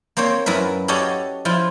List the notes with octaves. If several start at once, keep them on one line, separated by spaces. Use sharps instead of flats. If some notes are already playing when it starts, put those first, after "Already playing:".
A#3 C4 C5 C#5
F#2 E4 A#4 B4
F#4 G4 A4 C#5 D#5 F5
F3 E4 F4